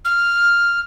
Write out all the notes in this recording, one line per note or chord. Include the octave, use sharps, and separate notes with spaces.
F6